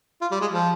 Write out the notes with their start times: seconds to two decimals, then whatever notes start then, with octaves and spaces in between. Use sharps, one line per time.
0.21 F4
0.31 G3
0.41 G#3
0.51 F3